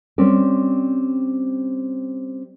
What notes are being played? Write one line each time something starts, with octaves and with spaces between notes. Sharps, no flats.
G3 C4 C#4 D5